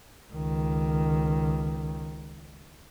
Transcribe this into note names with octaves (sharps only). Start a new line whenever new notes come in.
C#2 D#3